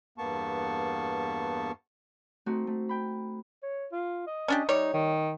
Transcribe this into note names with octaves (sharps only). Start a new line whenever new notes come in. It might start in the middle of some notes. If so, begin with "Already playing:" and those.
E2 G2 A#3 B3 A5 C#6
A3 C4 D#4 F#4
A3
G5 B5
C#5
F4
D#5
C#4 D4 G4
G3 D#4 C#5
D#3